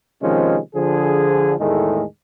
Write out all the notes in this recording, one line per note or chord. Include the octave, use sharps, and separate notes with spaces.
C3 D#3 F3 G#3 C4 C#4
D3 F3 G#4
E2 A2 D#3 G#3 A3